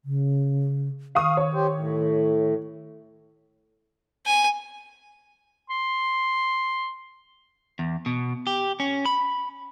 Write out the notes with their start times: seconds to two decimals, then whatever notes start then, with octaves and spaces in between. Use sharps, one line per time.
0.05 C#3
1.15 D#3 F5 C#6 D#6
1.37 C#5
1.54 G4 C5
1.75 A2
4.27 G#5
5.70 C6
7.79 E2
8.06 B2
8.47 G4
8.80 C#4
9.06 B5